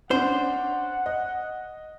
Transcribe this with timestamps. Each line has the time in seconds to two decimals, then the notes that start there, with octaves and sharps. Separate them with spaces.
0.11 C#4 D4 C5 F#5
1.06 D#5